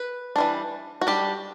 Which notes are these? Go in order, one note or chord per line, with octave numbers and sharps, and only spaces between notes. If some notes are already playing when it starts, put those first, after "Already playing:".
Already playing: B4
E3 G3 D4
F#4
G3 D4 G4